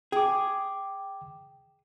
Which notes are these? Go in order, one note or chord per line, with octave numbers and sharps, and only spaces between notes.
G#4 G5 D6